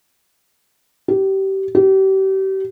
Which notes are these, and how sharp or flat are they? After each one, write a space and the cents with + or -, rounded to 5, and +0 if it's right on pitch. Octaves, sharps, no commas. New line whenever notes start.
G4 -25
G4 -35